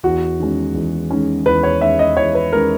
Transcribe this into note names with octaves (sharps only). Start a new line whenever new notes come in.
E2 F#4
D#3 G#3 C#4
E2
D#3 G#3 C#4
E2 B4
C#5
D#3 G#3 C#4 E5
D#5
E2 C#5
B4
D#3 G#3 C#4 A#4